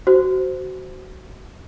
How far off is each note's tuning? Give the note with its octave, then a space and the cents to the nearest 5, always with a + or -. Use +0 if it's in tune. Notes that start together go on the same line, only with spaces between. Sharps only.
F#4 +20 C5 -15